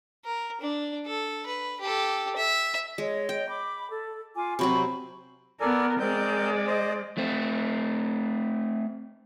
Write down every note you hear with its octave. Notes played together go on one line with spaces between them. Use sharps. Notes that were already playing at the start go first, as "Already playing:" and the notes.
A#4
D4
A4
B4
G4 A4
E5
G#3 C#5 D#5
G5
B5 D6
A4
F4 G#5 D6
C3 F#3 C4 B5 C#6
B3 A4 A#4 D5 G#5
G#3 C4 A#4 D5 G6
C5 D#5
A3 C4